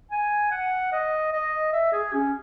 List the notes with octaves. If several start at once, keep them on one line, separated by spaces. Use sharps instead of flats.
G#5
F#5
D#5
D#5
E5
G#4
C#4